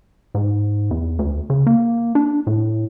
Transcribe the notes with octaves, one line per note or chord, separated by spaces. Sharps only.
G#2
E2
D2
C#3
A#3
D4
A2